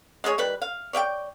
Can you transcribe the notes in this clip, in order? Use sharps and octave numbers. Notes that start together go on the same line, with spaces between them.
G#3 A3 G#4 C#5
D#3 G3 B4
F5
C#5 D5 E5 G5